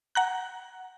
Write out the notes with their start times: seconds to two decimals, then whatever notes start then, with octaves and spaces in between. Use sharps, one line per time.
0.15 F#5 A#5 F#6